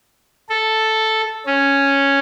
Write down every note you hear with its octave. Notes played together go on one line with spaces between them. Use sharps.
A4
C#4